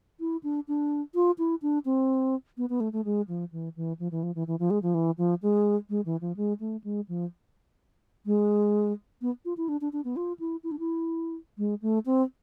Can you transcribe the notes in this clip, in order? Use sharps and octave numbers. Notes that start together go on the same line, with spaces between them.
E4
D4
D4
F4
E4
D4
C4
B3
B3
A3
A3
G#3
F3
E3
E3
F3
E3
F3
E3
E3
F3
G#3
F3
E3
F3
G#3
G#3
E3
F3
G#3
A3
G#3
F3
G#3
B3
F4
E4
D4
D4
D4
B3
F4
E4
E4
D4
E4
G#3
A3
C4